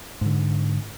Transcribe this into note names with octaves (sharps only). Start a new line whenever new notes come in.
G#2 D3